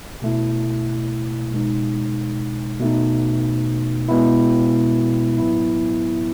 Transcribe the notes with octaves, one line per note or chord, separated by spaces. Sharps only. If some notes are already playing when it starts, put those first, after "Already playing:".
B2 A3 E4
B2 G#3 D#4
B2 A3 D#4
B2 G#3 B3 E4
A2 F#3 B3 E4